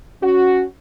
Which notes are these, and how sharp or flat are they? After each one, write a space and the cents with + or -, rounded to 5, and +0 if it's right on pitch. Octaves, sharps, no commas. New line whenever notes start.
C#4 +0 F#4 +0